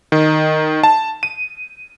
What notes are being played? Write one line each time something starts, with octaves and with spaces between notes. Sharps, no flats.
D#3
A5
D#7